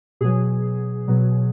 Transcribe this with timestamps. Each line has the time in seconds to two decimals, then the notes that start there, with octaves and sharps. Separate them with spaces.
0.21 B2 F#3 G#4
1.08 B2 F#3